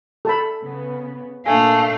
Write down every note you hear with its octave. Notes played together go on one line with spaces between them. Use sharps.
A4 A5 B5
C#3 B3
A#2 A3 A#3 D4 F5 G#5